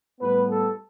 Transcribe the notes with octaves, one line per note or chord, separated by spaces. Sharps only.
A2 G3 B3 B4
A4